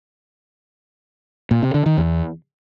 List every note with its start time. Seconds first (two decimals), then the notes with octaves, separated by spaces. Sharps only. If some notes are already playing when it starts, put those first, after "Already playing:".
1.51 A#2
1.63 C3
1.74 D3
1.86 D#3
1.98 E2